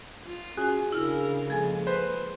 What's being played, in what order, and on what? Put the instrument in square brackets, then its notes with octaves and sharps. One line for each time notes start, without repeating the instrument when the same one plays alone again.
[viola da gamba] F4
[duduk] C#4 [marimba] F#4 G#5 [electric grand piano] G#4
[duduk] C#3 [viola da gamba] D4 A#4 [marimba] E4 E6 F6
[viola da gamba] F3 G#3 A#3 [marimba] G#4 A4 G#5
[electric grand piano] B4 C5